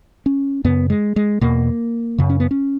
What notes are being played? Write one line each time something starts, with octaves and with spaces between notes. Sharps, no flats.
C#4
F#2 C#3 B3
G#3
G#3
E2 B2 A#3
F#2 C#3
C#4
B3
C#4